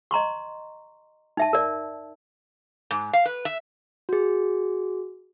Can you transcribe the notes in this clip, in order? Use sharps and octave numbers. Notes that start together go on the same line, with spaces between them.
D#5 A#5 C6 C#6
D#4 E5 A5
A#4 D5
G#2
F5
B4
E5
F#4 G#4